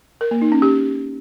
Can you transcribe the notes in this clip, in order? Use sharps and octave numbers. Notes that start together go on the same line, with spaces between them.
A#4
A#3
D#4
C#4
G4